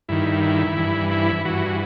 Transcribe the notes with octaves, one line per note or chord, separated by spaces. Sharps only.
G2 D#3 E4
E4
G2 E3
E4
G2 E3 F#4